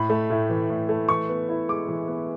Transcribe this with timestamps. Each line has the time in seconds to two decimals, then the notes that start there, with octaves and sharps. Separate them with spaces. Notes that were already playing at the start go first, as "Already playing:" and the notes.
Already playing: A2 B5
0.10 A3
0.30 A2
0.49 E3
0.70 A2
0.89 A3
1.09 E3 C#6
1.29 B3
1.49 E4
1.69 G#3 D6
1.88 E3
2.08 B3